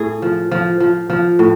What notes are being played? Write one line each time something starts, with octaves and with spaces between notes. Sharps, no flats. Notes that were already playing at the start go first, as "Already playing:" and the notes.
Already playing: A2 G#4
F3
F3
F3
F3
A2